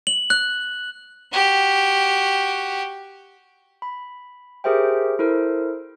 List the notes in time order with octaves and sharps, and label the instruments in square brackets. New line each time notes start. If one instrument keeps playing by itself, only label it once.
[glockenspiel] F#7
F#6
[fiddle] F#4 G4
[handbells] B5
G4 G#4 A#4 C5 E5 G5
E4 A4 A#4 C5